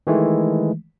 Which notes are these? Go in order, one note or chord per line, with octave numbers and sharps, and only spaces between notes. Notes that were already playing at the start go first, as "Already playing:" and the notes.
D#3 E3 G#3 A3